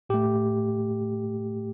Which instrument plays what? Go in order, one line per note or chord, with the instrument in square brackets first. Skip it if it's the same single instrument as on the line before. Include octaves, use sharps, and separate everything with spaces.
[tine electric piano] A2 A3 G4